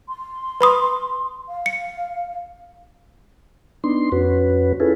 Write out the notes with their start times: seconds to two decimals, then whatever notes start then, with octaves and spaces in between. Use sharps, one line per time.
0.09 C6
0.61 B4 B5 D#6
1.49 F5
1.66 C#7
3.84 B3 D4 D#4 C6
4.12 F2 C#4 F#4 B4
4.80 C#4 E4 F4 G#4 A4 B4